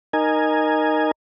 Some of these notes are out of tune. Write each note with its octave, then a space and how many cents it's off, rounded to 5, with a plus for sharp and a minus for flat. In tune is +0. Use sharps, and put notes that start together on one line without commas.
D#4 -10 A#4 +0 G#5 +0